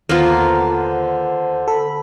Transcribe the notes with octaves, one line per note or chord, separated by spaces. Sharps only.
D#2 D3 A#3 B3 F4 C5
A4 B5